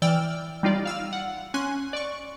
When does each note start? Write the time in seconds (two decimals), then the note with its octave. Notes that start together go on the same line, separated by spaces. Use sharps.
0.02 E3 D5 G5 E6 F6
0.63 G3 D#4 F4 D5
0.85 F5 E6 F6
1.13 F#5
1.54 C#4 G#5 C6 F#6
1.93 D5 C#6